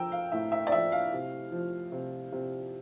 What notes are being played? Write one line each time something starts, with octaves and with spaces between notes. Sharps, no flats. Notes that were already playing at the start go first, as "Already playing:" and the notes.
Already playing: F3 G5 A#5 E6
F5
A2 E5
E5
D5
F3 E5
F5
C3
F3
C3
C3